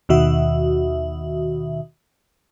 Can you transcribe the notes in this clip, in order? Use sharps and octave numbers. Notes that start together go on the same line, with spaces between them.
D#2 B2 D#3 F#4 E5